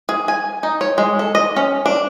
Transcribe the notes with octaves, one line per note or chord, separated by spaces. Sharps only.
G#4
G#5
D#4
C#5
G#3
A4
D#5
C#4
D4